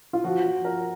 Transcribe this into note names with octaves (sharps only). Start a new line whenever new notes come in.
F4
F3 F#4
F3
A#4